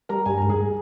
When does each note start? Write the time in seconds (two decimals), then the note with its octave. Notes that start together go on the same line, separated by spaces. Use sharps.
0.09 G3 A#4 A#5
0.26 G2 G#5
0.38 G#2 A#5
0.49 G#4 G#5